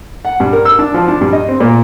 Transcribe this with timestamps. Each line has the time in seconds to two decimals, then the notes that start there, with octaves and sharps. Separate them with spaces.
0.25 F#5
0.40 G2
0.53 A#4
0.65 E6
0.79 D4
0.94 F3
1.08 D4
1.21 G2
1.33 D#5
1.48 C4
1.60 A#2